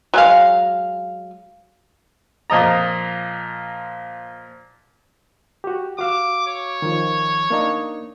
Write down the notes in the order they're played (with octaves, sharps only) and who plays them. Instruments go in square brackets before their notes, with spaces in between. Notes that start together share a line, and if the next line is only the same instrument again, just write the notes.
[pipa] F#3 G#3 F5
[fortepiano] A#2 F3 D#5 A#5
[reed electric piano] F#4 G4
[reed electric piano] F#4 F5 E6 [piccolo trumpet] D6
[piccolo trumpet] C#5
[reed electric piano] D#3 F3
A#3 D4 D#4